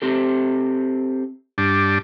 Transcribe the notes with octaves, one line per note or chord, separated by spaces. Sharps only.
C4 G4 A4
G2 D4